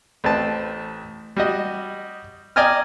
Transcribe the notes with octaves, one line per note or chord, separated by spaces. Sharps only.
A1 C4 B4 A5
G3 F#4 D#5
D5 D#5 G5 G#5 A#5 F6